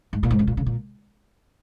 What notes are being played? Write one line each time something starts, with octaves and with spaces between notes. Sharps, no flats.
G#2
A#2
G#2
C#3
A#2
C#3
A#2